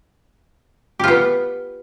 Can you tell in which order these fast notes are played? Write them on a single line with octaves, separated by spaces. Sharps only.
G4 F4 B3